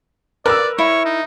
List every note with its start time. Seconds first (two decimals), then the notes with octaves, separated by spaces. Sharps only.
0.46 A#4 B4 D5 E6
0.78 E4 C#5
1.05 D#4